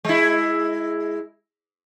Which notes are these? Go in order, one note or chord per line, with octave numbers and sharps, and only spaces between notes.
G#3 E4